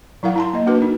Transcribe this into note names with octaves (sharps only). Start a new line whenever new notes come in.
F#3 E4 A#4 F5 F#5
E4 A5 C6
A#3 D#5
A#3 D4 F#4 A#4 B4
D#4